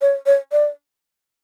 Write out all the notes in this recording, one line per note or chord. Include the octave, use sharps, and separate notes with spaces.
C#5
C#5
D5